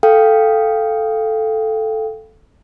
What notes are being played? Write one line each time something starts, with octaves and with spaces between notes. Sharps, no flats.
A4 F5 G5